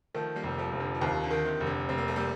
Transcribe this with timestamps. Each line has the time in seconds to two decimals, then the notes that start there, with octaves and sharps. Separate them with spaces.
0.14 D#3 F3 A3
0.36 G3 A#3
0.43 F1
0.58 F3 A3
0.73 F1
0.80 D3 F3
0.95 F3
1.01 D#2 C3 D#3
1.23 D3
1.31 D#3
1.45 C3
1.61 F1
1.67 D3
1.89 F1 C4
1.98 A#3
2.08 A3
2.16 G3 A#3